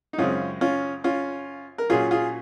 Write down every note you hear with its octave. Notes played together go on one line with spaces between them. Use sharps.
D#4
F#2 C#3 G#3 C4 C#4 F4
C#4 F4
C#4 F4
A#4
A#2 F#3 C#4 F4 G#4
F4 G#4